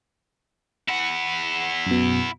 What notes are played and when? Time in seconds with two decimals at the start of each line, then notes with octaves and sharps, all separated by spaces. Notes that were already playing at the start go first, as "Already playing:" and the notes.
0.88 E4 F#5
1.86 F#2 B2